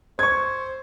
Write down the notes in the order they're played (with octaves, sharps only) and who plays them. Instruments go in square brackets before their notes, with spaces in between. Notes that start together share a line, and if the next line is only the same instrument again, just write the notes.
[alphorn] C5 [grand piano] C#6 G#6